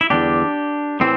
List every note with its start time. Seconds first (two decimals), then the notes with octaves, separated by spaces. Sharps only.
0.01 E4
0.10 E2 D3 G3 D4 G4
1.00 A2 E3 C4